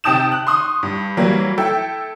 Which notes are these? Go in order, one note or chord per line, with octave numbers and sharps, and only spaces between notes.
C3 G5 A5 D#6 G6 E7
F#6
C6 C#6 D#6
G2
E3 F#3 G3 A#3
E4 A4 G5